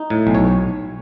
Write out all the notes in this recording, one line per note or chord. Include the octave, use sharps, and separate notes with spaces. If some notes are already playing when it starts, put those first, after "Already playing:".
Already playing: D#4
A2
B1
C#5